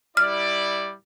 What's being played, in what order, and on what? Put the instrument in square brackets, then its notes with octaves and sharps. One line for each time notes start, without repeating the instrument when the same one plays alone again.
[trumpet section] G3 E4 D5 [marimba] F6